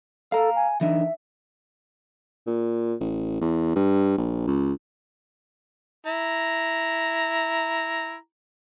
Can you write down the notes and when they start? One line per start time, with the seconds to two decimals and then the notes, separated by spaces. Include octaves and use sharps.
0.32 A4 F5 A#5
0.56 G#5
0.81 E3 D4 D#4 E5
2.47 A#2
3.01 A1
3.41 E2
3.76 G2
4.18 A#1
4.47 C#2
6.06 E4 A#5